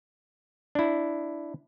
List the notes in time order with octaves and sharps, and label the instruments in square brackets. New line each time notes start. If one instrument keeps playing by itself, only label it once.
[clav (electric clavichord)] D4 E4